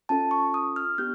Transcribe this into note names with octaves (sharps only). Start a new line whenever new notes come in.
C#4 F4 A4 A5
C#6
D#6
F6
B3 D4 G4 G6